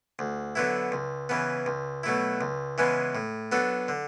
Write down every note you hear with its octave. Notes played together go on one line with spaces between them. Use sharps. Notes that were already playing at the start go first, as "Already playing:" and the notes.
D2
D3 F#3 B3 E4
C#2
C#3 E3 B3
C#2
B2 F#3 A3 E4
C#2
C#3 E3 G#3 B3
A2
F#3 B3 D4 A4
D3